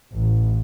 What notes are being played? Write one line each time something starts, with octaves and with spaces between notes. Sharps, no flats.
A1